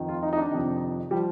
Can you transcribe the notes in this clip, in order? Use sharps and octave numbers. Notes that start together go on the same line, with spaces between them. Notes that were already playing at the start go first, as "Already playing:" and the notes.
Already playing: F2 D#3
F4
D#4
D#4
D4
F2 C3 D#3
F3 G3